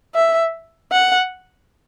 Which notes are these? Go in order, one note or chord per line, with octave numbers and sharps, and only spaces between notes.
E5
F#5